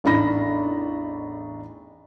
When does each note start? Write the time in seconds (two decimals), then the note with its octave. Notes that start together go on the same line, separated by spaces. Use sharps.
0.04 A1 E2 D4 D#4 B5 A#6